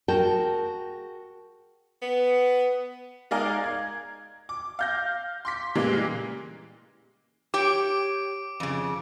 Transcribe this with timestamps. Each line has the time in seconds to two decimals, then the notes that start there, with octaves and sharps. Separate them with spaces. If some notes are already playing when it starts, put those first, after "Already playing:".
0.08 F#4 G#4 A#4 G5 A5
2.02 B3
3.31 G#3 D#4 A#4 D5 F5 G#5
3.64 G#6
4.49 D6
4.79 F5 G6 A#6
5.45 C6 D6 B6
5.75 A#2 C#3 E3 G3 G#3 A#3
7.54 G4 C#5 G5 D6 D7
8.60 F2 C#3